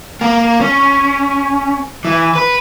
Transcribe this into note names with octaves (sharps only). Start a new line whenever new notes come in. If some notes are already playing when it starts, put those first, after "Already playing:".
A#3
C#4
E3
B4